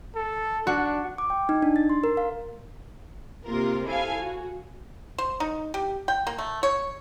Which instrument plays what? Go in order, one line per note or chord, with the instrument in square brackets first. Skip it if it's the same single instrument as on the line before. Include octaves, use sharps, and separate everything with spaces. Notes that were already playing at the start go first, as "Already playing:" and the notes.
[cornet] A4
[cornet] D4 [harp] F#4
[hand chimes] D6
G5
D#4
D4
A6
C6
A#4
F5
[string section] C3 A#3 F4 A#4
E4 A4 F5 G#5
F#4
[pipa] C5
D#4
G4
G5
A#3
A3
C#5